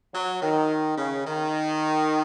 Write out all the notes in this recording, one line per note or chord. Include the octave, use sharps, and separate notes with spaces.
F#3
D#3
C#3
D#3